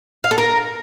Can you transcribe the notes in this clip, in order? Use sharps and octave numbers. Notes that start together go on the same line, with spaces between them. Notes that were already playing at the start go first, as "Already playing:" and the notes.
F5
A4
A#4